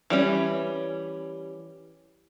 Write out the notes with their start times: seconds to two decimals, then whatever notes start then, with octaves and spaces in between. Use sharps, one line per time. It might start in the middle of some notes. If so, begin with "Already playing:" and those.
0.10 E3 G3 C#4